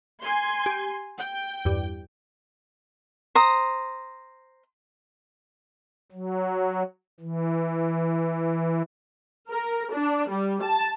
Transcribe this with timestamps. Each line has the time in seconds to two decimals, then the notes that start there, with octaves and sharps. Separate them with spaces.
0.22 G#5 C6
0.66 G4
1.17 G5
1.65 E2 G2
3.35 C5 A#5 D#6
6.12 F#3
7.20 E3
9.51 A#4
9.92 D4
10.29 G3
10.62 A5